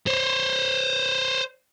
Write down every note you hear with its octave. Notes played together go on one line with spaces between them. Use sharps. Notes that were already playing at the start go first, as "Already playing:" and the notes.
C5 C#5